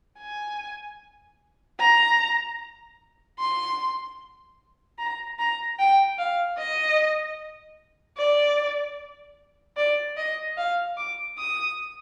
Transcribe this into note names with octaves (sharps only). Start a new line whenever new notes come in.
G#5
A#5
C6
A#5
A#5
G5
F5
D#5
D5
D5
D#5
F5
D6
D#6